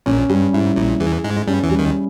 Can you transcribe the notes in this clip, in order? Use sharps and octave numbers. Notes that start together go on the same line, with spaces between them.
A#1 A#2 C#4
G2 G3
G#2 E4
A#1 A#2 E4
E2 E3 G#4
G#2 G#3 G#4
G2 G3 C#4
E2 E3
G3
D#2 D#3